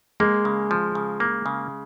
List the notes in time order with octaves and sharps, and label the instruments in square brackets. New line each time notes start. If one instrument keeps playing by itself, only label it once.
[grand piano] G#3 [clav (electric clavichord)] A#3
[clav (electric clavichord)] C#3
F3
C#3
A#3
C#3